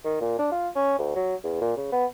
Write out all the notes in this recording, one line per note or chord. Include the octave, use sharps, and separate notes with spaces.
D#3
A#2
D4
F4
C#4
D2
F#3
E2
A#2
C#3
B3